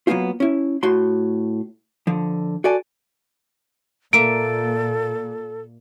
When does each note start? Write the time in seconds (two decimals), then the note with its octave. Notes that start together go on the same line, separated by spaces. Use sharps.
0.07 F#3 A#3 B3 C#4 D#4 F4
0.40 C#4 E4
0.83 A2 F#4 C6
2.07 D3 F3
2.64 F#4 A4 D5 G#5
4.13 A#2 A#3 A4 E5 A#5 D7